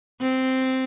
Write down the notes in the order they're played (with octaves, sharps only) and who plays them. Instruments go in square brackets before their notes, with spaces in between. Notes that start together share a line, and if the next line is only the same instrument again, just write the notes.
[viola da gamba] C4